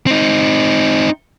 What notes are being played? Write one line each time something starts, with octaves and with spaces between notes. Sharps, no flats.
C4 D#4